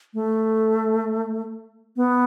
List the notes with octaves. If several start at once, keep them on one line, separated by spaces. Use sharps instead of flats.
A3
B3